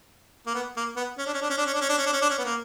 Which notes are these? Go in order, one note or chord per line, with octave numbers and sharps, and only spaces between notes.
A#3
B3
A#3
B3
C#4
D4
C#4
D4
C#4
D4
C#4
D4
C#4
D4
C#4
D4
C#4
D4
C#4
B3
A#3